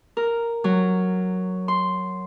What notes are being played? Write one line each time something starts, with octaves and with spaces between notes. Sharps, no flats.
A#4
F#3
C6